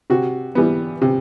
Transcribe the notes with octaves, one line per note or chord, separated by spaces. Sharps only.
C3 F#4
E3 G3 B3
C3